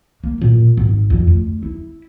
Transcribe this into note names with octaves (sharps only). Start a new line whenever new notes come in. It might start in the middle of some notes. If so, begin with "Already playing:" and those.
A#3
A#2
G#1
F2
D2
E4